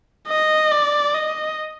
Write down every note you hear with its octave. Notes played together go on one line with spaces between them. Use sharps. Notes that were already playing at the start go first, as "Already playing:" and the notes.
D#5
D5
D#5